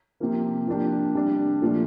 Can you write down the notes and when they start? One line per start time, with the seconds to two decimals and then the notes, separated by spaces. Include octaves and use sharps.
0.20 C3 F3 A#3
0.67 F3 A#3 D4 G4
1.15 C3 G3 D4
1.62 A#2 F3 A3